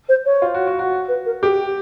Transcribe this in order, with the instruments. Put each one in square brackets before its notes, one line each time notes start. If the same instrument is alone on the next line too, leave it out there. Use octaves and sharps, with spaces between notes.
[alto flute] C5
C#5
[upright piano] F4
F#4
F#4
F#4
[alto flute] B4
A#4
[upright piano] G4 [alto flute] G#4
[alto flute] G4